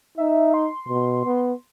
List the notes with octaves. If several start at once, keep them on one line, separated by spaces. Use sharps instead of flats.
D#4 E5
C6
B2
B3